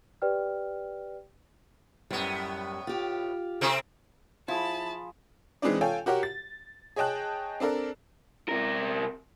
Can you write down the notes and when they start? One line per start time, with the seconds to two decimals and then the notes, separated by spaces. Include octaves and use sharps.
0.22 G4 B4 D5 G5 F6
2.11 F#2 A2 G3 B3
2.87 F4 G4
3.61 C3 C4 A4
4.48 F3 E4 G#4 A5 B5
5.62 E3 G#3 C4 D4 D#4 D5
5.81 F4 A4 C#5 G5 G#5
6.06 F#4 G4 A#4 C#5 F#5
6.23 A6
6.96 G#4 C#5 D#5 G5 A5 F#6
7.60 C4 D4 A4 A#4
8.49 C3 A#4